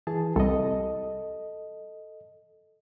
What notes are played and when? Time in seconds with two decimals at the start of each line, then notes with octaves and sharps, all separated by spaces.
0.07 E3 G#4 A5
0.36 C2 A4 D#5